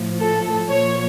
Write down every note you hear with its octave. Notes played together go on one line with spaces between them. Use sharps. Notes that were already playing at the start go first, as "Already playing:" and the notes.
Already playing: A2 F3
A4
A#2 F3 C#5